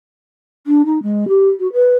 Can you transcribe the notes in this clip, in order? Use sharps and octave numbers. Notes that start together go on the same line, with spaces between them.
D4
D#4
G#3
G4
F#4
B4